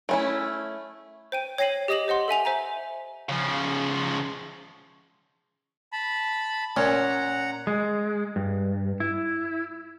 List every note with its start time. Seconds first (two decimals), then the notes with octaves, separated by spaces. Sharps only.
0.09 A3 C#4 E4
1.32 C5 G5 D#7
1.58 C#5 G5 A#6 C7 D#7 F#7
1.88 G4 D#5 D#6 A#6 E7 F#7
2.08 C5 D#5 F#5 C6
2.28 A4 E5 G#5 F7
2.45 C5 E5 G#5 A#5
3.29 C#3 F3
5.92 A5 B5
6.77 A#2 C#4 F#5 A#5
7.67 G#3
8.36 G2
9.00 E4